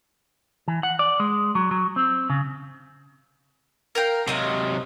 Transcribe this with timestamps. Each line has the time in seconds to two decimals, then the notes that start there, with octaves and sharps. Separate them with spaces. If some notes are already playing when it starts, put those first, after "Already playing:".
0.68 E3
0.83 F#5
0.99 D5
1.20 G#3
1.55 F#3
1.71 F#3
1.96 C4
2.30 C#3
3.95 A#4 F5 G5
4.28 C3 F#3 C4 D#5 F5